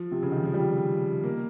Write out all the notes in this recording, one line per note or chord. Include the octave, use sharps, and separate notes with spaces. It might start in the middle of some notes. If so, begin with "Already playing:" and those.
Already playing: F3
C3
C#3
D#3
F3
G3
A#3